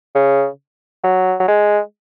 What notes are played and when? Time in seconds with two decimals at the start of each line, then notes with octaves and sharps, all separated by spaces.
0.15 C#3
1.04 F#3
1.40 F#3
1.48 G#3